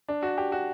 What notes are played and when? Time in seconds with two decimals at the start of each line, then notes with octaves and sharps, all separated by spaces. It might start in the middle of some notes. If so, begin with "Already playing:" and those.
0.09 D4
0.23 F#4
0.38 G4
0.52 F#4